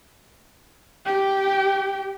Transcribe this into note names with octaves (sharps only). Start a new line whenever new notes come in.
G4 G5